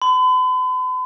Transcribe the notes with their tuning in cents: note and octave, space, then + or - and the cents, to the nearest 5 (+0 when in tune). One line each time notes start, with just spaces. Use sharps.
B5 +45